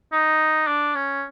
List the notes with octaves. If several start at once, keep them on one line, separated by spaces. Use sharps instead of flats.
D#4
D4
C#4